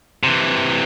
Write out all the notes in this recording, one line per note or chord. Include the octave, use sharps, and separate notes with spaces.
C3 E3